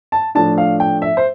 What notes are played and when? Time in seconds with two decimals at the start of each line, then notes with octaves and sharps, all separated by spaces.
0.12 A5
0.35 A2 F3 A3 D4 A5
0.58 F5
0.80 G5
1.02 E5
1.17 C5